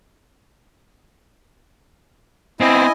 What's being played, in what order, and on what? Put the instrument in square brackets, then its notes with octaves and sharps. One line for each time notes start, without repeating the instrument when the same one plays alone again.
[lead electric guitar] B3 C4 [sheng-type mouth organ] E4 D#5 G#5